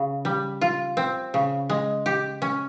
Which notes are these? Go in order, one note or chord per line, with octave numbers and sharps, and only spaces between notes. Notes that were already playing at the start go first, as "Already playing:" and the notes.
Already playing: C#3
G3
F4
C4
C#3
G#3
G4
C#4